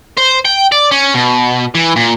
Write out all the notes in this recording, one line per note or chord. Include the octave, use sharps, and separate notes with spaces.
C5
G5
D5
C#4
B2
E3
A#2